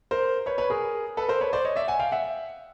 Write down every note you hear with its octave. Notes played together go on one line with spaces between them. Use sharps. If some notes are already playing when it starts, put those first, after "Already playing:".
A#4 C5
B4 C#5
B4 C#5
G#4 A#4
A4 B4
A#4 C5
B4 C#5
C5 D5
C#5 D#5
D5 E5
F#5 G#5
F5 G5
E5 F#5